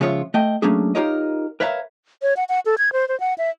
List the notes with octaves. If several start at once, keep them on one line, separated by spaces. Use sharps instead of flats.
C#3 F3 G#3 F4 C#5 E5
A3 D#5 G5
F#3 A3 A#3 C#4 D4 G#4
D#4 F4 G4 A#4 C#5 D#5
A#4 B4 C#5 E5 F5 A#5
C#5
F#5
F#5
A4
G#6
C5
C5
F#5
E5